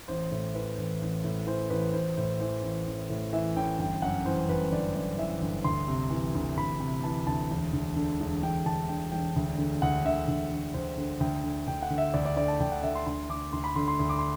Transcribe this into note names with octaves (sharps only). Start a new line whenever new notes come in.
A1 C5
A2
E3 B4
A1
A1
A2
E3 C5
A1 B4
A1 C5
A2 C5
E3 C5
A1
A1
A2
E3 E5
A1 G5
G1 G5
F#2 F#5
E3 C5
G1 B4
G1 D5
F#2 D5
E3 E5
G1
D2 C6
C3
E3
D2
D2 B5
C3
E3 A5
D2 A5
E1
D2
D3
E1
E1 G5
D2 A5
D3 G5
E1 G5
D2
D3
D2 F#5
D3 E5
D2
D3
D2 C5
D3
D2 G5
D3
D2 G5
F#5
D3
E5
D2 D5
D5
D3 D5
A5
D2 G5
F#5
D3 E5
C6
D2 C6
D3 D6
D2 C6
B5
D3 C6
C6
D2
D6
C6